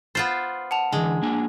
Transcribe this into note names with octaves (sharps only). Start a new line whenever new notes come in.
B3 F4 C5 A6
F#5 A5 F7
D3 E3 G#3
A#3 D4 G#5